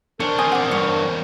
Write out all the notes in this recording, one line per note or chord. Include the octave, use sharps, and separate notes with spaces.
E2 D4 A#4 C5 C#5
D3 C4 G#5 D#6
F#5 D6
G2 C#5